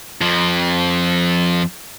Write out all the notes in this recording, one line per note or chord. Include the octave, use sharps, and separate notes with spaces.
F2 F3